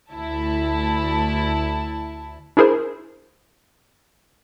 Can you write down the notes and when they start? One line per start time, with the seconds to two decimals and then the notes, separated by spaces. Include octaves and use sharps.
0.13 D2 E4 A5
2.57 D4 E4 G#4 A#4 C5